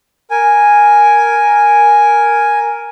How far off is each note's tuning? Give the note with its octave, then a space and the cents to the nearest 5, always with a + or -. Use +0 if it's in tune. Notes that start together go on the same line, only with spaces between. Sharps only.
A#4 +0 G#5 +0